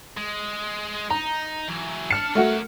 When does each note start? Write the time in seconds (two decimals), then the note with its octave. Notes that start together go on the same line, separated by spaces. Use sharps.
0.18 G#3
1.10 D#4 A#5
1.68 E3 F#3
2.11 D4 A5 F6 C#7
2.35 A3 F#4 A#4 F#5